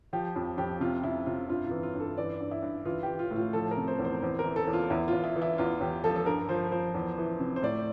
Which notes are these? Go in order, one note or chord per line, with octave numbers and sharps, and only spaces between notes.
F3 G4
F2
F2 G4
C3 F4
C3 E4
C3 F4
G2 F4
F4
E3
F4
G2
A4
E3 D5
G2
E4
G2
E3 F4
G4
E3
F4
A2
F4
F3 A4
A#4
C3
C5
E2
C5
E2 C5
A#4
E3
A4
E2
F4
E2 E4
E2 F4
E4
E3
E4
E2 F4
E2 G4
F3 A4
A4
G2 A#4
F3 C5
F3 C5
E2
E3
C3
C5
A2 D5